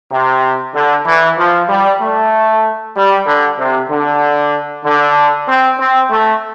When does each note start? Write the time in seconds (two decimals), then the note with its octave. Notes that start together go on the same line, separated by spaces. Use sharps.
0.12 C3
0.74 D3
1.06 E3
1.38 F3
1.69 G3
2.01 A3
2.96 G3
3.27 D3
3.59 C3
3.90 D3
4.85 D3
5.48 C4
5.79 C4
6.11 A3